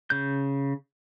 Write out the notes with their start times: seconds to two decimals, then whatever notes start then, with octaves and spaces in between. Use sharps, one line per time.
0.10 C#3 G6